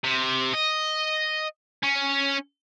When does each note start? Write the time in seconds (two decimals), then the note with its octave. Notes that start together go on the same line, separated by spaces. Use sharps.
0.04 C3
0.54 D#5
1.84 C#4